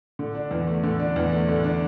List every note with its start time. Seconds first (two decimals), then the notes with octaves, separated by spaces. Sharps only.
0.19 D3
0.35 D4
0.51 E2
0.67 A3
0.83 D3
1.00 D4
1.16 E2
1.32 A3
1.48 D3
1.64 D4